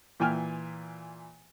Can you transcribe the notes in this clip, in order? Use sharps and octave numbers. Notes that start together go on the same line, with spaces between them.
A#2 E3 G5 G#5 F6